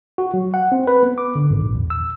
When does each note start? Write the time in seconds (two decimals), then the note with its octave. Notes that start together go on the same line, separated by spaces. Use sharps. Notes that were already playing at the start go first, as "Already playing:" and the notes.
0.18 F#4
0.34 F#3
0.54 F#5
0.72 C4
0.87 B4
1.03 B3
1.18 D6
1.35 D3
1.50 G#1
1.61 A#1
1.75 E2
1.90 E6